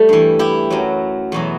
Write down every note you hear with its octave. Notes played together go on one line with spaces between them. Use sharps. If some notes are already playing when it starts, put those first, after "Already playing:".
Already playing: G3 A3
G2 E3
E4 G4
F#2 F#3
E2 B2 F#3